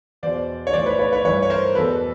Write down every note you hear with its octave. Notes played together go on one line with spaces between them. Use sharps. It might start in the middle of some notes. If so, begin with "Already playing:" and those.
E2 B2 C5 D5
C#5
A2 E3 C5 D5
B4 C#5
B4 C#5
B4 C#5
G2 E3 B4 C#5
C#5
A#4 C5
E2 B2 A4 B4